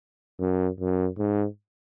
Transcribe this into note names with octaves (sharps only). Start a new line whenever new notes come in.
F#2
F#2
G#2